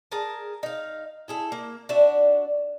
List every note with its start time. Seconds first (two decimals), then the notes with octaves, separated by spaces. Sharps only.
0.11 G#4 A#4 A5
0.63 D#4 F5
1.28 E4 G#4 A4
1.52 A#3
1.89 D4 F#4 E5